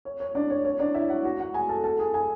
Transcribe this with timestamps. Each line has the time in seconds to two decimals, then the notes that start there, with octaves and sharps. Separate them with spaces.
0.05 C#5
0.20 C#5
0.35 D4 D5
0.50 C#5
0.65 C#5
0.79 D4 D5
0.94 E4 E5
1.09 F#4 F#5
1.24 F#4 F#5
1.39 F#4 F#5
1.54 G#4 G#5
1.69 A4 A5
1.84 A4 A5
1.99 G#4 G#5
2.14 G#4 G#5